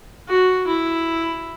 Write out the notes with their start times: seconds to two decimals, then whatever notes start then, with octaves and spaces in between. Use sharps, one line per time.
0.28 F#4
0.67 E4